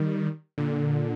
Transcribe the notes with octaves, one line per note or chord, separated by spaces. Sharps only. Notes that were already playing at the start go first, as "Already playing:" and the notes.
Already playing: D#3 G3
A#2 D3